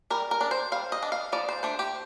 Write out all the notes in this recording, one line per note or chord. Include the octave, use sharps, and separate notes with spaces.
G3 A#4
A#4
D4
C5
G3 F5
D#5
D4
F5
F3 D5
C5
A3 D4 C5
G4